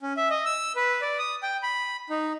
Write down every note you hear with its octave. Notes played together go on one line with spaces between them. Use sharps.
C#4
E5
D#5
E6
B4
D5
D#6
G5
B5
D#4